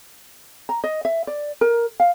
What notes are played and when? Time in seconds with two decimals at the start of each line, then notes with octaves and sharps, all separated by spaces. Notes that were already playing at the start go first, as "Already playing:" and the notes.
0.69 A#5
0.84 D#5
1.05 E5
1.27 D5
1.61 A#4
2.00 F5